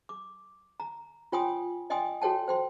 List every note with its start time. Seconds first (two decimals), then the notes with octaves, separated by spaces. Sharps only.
0.09 D6
0.80 A#5
1.32 F4 C#5 G5 G#5 C6 D#6
1.90 D5 D#5 G5 G#5 C6 D#6
2.22 F#4 A4 C#5 G5 A5
2.48 C5 G5 C6